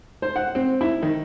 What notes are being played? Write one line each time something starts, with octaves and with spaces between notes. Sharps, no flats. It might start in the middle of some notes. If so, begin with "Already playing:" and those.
C5
F#5
C4
E4
D#3